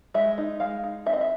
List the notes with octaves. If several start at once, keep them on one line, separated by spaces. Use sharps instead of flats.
G#3 E5
D#4
G#3 F5
D#4
C4 E5
D#5
E5